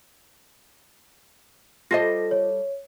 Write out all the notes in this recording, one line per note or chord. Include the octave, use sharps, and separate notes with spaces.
G3 F4 G4 A4 C5 D#5 A#6
C#5